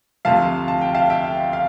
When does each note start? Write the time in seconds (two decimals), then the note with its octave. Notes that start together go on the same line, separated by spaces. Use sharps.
0.25 D2 C3 F3 F5 A5
0.68 A5
0.81 G5
0.95 F5 A5
1.10 E5 G5
1.53 F5